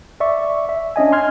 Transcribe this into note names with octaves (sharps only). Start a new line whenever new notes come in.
D5 E5 C#6
E5
C#4 D4 D#5 G#5
C6 F6 G#6